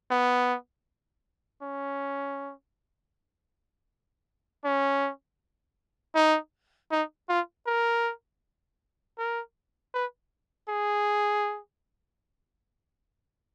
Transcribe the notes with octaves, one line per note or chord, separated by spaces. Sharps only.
B3
C#4
C#4
D#4
D#4
F4
A#4
A#4
B4
G#4